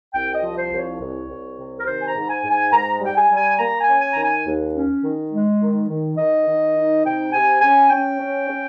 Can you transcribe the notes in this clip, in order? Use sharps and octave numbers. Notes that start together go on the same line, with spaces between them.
C2 G5
D#5
F3
C5
C2
C#5
C2
C2
C3
A#4
D#3 C5
G#5
A#5
G#2
G#5
G#2
G#5
G#2 A#5
G3 G5
G#5
G3
G#5
A#3 A#5
G#5
C#4
G#5
D#3 A#5
G#5
D#2
C#4
D#3
G#3
D#3
D#3
D#3 D#5
D#3
D#4
C3 G5
C3 G#5
C#4 G#5
C#4 G5
C#4
C#4